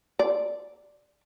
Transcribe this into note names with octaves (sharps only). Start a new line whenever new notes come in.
D5